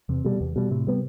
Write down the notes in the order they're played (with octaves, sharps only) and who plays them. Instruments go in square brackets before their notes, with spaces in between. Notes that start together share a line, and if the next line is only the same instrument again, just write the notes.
[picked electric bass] E2 [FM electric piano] C3
[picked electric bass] B2 G3
E2
B2 G3
[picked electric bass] A2 [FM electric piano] C3
[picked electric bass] G3 B3